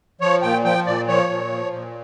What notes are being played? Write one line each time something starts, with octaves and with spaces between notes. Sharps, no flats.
F3 C#5
A#2 G5
F3 G5
A#2 D5
F3 C#5
A#2
F3
A#2